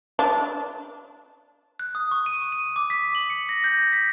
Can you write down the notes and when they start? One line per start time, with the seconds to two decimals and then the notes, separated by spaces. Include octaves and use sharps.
0.19 D4
1.80 F#6
1.95 D#6
2.11 C#6
2.26 D#7
2.52 D#7
2.76 D6
2.90 B6
3.15 F#7
3.30 C#7
3.49 A#6
3.64 G6
3.93 B6